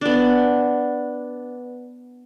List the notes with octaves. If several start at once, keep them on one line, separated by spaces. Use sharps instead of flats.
B3 D4